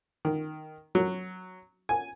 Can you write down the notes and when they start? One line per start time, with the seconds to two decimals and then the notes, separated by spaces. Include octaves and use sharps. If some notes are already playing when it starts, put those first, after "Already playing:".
0.25 D#3
0.95 F#3
1.89 G#5